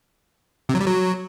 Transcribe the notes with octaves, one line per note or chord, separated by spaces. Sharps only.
C3
F#3
G3
F#3